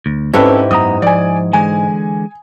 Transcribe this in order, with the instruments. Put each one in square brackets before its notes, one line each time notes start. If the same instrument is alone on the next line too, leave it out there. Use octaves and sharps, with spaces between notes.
[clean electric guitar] D2
[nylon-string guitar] G#2 E4 G4 [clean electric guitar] C4 [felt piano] C#4 A4 B4
[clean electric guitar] F#2 B3 A#5 [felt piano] D#6
[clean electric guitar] F3 [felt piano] D5 G#5
[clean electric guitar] D3 E3 G#3 [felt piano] G#5